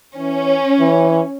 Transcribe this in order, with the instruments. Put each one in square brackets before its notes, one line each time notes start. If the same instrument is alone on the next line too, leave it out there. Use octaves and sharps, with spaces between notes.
[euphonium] E3 [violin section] C#4
[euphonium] E3